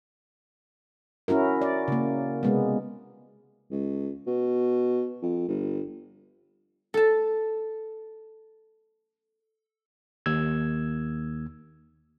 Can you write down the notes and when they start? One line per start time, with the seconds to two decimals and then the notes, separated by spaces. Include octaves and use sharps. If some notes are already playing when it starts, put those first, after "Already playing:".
1.28 C#4 E4 F#4 A#4
1.62 D5
1.88 C#3 A#3
2.43 C3 G#3 B3
3.71 C#2
4.27 B2
5.22 F2
5.48 G1
6.94 A4 A5
10.26 D#2 E6 G#6